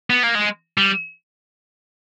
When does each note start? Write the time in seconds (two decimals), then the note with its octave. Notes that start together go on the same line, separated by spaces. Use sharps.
0.10 B3
0.23 A#3
0.35 G#3
0.78 G3